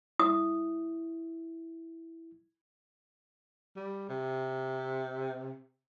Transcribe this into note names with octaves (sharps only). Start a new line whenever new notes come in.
E4 D#6
G3
C3